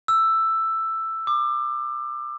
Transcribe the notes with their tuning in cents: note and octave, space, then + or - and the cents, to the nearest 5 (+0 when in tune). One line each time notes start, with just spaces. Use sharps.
E6 +5
D6 +30